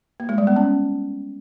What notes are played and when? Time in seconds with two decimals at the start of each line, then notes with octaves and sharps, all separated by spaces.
0.20 A#3
0.29 G#3
0.38 G3
0.47 B3
0.56 C#4